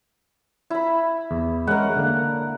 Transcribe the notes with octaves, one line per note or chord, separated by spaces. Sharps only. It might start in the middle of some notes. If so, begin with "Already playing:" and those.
E4 B5
E2
G#3 C#4 A#4 F#5
D3 A#3